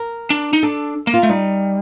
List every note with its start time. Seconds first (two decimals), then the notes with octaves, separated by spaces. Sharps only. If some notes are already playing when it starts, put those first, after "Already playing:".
Already playing: A#4
0.30 D4
0.53 D#4
0.63 D4 A4
1.07 A#3
1.14 F4
1.23 A3
1.29 G3 D#4